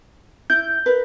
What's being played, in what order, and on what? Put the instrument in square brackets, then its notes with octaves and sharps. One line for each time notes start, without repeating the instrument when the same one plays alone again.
[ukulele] E4 [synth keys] G6
[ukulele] A#4 B4